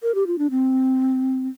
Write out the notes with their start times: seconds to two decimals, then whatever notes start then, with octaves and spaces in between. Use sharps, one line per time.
0.03 A#4
0.15 G4
0.27 F4
0.38 D4
0.51 C4